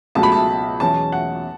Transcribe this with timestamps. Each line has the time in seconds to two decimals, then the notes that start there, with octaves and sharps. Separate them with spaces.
0.15 C#2 B2 F#3 A3 A5
0.23 B5
0.32 A5
0.80 E2 B2 F#3 C#4 A5
1.12 F#5